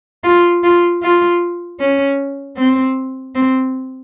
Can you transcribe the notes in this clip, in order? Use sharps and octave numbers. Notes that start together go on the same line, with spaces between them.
F4
F4
F4
C#4
C4
C4